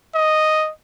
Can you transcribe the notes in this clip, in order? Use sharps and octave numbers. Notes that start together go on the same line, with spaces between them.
D#5